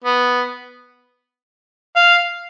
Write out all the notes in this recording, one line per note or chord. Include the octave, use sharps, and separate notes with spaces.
B3
F5